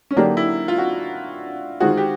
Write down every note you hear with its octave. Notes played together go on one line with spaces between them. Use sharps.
C#4
D3 F#3 A#3 D4 D#4 G4
E4
F4
F#4
D#3 G#3 C4 F4 F#4 G#4
G4